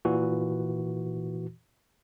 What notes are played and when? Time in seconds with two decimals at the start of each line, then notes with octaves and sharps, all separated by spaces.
0.05 A#2 E3 F#4